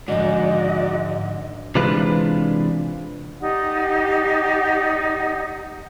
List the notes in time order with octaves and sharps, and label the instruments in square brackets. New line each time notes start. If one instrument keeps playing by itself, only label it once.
[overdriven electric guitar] G#2 [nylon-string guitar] D3 D#3 F3 [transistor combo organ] F#4 D5 [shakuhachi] D#5
[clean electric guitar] C3 E3 G#3 D4 F4 B4
[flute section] D#4 G4 D5 F#5